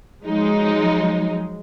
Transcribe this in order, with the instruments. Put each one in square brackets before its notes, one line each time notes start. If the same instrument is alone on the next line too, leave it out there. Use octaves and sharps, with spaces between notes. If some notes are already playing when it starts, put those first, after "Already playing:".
[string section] F3 F#3 G#3 D#4